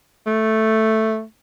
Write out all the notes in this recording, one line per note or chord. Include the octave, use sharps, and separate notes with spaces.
A3